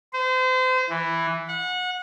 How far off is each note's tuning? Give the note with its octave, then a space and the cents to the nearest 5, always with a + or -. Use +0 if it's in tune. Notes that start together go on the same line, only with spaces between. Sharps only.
C5 -35
E3 +5
F#5 -25